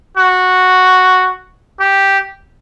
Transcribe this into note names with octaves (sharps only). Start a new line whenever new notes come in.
F#4
G4